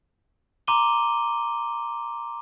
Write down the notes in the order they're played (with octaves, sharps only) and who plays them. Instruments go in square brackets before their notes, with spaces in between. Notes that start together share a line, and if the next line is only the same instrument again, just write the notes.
[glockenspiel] A#5 C6 D6 D#7 G7